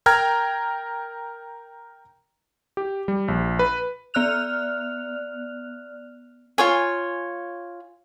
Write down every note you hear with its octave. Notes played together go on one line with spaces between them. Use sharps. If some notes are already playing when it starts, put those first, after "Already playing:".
A#4 G5 A#5 F6 G#6
G4
G3
A#1
B4
B3 D5 F6 F#6 F7
F4 C#5 G#5